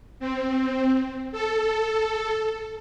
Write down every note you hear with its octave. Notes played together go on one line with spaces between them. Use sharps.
C4
A4